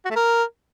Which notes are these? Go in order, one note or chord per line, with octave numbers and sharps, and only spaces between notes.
F#4
A3
A#4